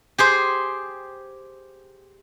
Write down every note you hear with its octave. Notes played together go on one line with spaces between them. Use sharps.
G4 G#4 C5